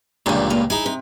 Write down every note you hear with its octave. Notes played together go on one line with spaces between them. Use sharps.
C#2 G2 A#2 D3 F3
A#3 B4 F5
D#4 E4 G#4 G#5
C3